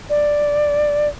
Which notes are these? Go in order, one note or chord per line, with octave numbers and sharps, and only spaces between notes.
D5